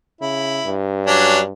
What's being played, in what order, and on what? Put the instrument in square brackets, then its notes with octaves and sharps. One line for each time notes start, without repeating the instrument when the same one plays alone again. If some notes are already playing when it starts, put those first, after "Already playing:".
[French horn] C#3 [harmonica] E4
[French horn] G2
[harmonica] F#3 C#4 D4